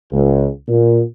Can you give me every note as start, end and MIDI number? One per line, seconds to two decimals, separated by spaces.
0.11 0.48 37
0.68 1.02 46